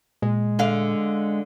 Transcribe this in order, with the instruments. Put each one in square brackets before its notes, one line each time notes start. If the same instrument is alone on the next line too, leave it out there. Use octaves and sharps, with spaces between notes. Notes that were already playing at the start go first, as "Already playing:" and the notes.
[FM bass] A#2 [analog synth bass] G#3
[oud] D3 F5